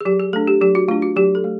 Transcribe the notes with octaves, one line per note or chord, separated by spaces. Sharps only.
G#4
F#3 G4
G#4
A3 D4 A4
G4
F#3 G4
F#4
A3 D4 F4
F#4
F#3 G4
A4
A3